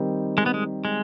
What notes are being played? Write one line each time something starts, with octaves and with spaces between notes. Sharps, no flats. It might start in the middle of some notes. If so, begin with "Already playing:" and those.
Already playing: D#3 G3 C4 D#4
G#3
B3
G#3
G#3